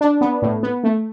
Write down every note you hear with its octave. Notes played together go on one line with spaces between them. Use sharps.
D4
B3
A2
B3
A3